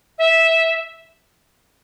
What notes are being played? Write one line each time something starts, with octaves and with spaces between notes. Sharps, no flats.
E5